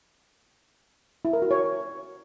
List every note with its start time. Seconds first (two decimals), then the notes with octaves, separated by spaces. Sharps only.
1.25 E4
1.33 A#4
1.42 F#4
1.51 C#5